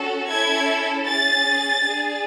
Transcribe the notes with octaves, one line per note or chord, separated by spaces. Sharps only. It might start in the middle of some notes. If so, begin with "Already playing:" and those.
Already playing: C#4 F#4 A4
C#4 E4 A4 G#6
C#4 G#4 A6
D4 G#4